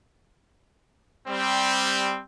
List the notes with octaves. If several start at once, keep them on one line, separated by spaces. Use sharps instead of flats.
G3 C4